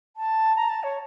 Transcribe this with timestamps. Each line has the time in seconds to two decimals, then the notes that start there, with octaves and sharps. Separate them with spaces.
0.17 A5
0.56 A#5
0.69 A5
0.83 C#5